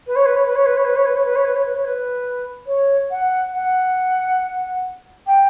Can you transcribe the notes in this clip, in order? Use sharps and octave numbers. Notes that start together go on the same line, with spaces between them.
B4
C#5
B4
C#5
B4
C#5
B4
C#5
B4
C#5
B4
C#5
B4
C#5
B4
C#5
B4
C#5
B4
C#5
F#5
F#5
G5